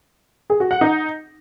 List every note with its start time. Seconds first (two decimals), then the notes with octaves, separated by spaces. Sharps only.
0.50 G#4
0.60 F#4
0.71 F#5
0.81 D#4